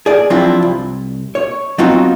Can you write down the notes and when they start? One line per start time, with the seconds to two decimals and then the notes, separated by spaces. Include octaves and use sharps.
0.06 G#4 D5
0.30 F3 F#3 C4 D4 E4 F4
0.63 C2
1.35 C#5
1.78 F#3 B3 C4 D#4 F4 F#4